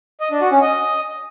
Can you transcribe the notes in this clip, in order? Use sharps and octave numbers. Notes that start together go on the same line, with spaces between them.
D#5
D4
F#4
C#4
D#5